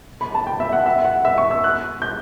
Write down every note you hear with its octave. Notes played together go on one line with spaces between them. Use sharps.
B5
A5
G5
E5
F#5
E5
F#5
E5
C#6
E6
F#6
G6